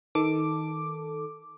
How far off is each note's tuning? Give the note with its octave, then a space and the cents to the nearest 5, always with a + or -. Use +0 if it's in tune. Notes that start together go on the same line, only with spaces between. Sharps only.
D#3 +20 A4 +0 D6 +0